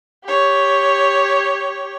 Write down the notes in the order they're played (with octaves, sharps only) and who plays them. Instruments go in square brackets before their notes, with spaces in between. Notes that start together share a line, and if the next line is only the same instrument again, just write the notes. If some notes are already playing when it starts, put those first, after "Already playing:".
[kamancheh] G4 C#5